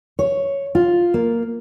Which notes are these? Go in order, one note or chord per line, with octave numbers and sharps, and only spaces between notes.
C#5
F4
A#3